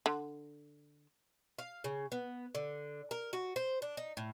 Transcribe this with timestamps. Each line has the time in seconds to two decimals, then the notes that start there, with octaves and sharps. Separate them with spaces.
0.06 D3
1.59 F5
1.84 C#3
2.12 B3
2.55 D3
3.11 A#4
3.33 F#4
3.56 C5
3.82 D4
3.97 D#4
4.17 A2